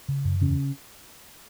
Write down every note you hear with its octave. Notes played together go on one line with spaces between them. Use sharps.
C#3
F#2
E2 C#3 C#4